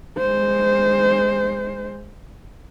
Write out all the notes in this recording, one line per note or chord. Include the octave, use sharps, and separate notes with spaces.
G#3 C5